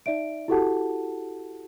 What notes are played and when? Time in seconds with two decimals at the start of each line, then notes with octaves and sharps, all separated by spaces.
0.06 D#4 D5 E5 D7
0.48 E4 F#4 G4 A4 F#5 A5